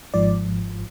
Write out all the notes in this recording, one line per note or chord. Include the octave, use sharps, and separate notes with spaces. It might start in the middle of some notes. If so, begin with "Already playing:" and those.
G#1 G#2 F3 D5